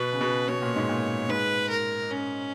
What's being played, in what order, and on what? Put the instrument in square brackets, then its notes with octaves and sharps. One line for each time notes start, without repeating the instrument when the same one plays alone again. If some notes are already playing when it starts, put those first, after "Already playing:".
Already playing: [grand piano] B2 [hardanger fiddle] B4
[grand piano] C#3
B2
[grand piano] B2 [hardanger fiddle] C#5
[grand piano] A#2
G#2
A#2
[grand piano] G#2 [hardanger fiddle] B4
[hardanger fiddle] A#4
C#4